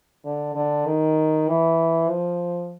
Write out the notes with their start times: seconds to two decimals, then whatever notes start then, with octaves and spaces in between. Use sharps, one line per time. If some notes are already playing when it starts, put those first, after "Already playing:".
0.25 D3
0.55 D3
0.86 D#3
1.49 E3
2.10 F3